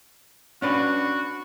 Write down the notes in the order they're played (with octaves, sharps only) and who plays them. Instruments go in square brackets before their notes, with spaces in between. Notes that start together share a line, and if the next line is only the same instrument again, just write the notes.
[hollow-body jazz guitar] C#4 D4 B4 [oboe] F#4